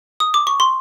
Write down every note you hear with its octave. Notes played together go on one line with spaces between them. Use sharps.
D#6
D6
C#6
C6